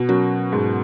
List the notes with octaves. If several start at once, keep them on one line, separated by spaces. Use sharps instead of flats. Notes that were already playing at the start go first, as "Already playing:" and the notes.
Already playing: B2
F#3 C#4 F#4 A#4
G#2